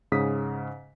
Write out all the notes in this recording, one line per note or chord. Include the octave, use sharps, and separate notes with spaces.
G#2 C#3 D#6 B6